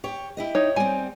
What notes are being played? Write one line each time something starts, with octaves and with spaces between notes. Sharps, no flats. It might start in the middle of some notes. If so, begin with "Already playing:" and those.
G4 C#5
E4 G4 D#5
D#4 C#5
G3 C4 G#5